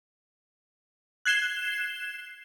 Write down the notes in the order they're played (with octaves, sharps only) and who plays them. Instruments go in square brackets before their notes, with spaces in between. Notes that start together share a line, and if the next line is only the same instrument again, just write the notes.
[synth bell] F#6 G#6 C7 E7 G7